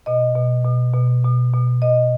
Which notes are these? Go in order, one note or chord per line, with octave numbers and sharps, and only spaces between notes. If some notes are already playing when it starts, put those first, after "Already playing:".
B2 D#5
B2
B2
B2
B2
B2
B2 D#5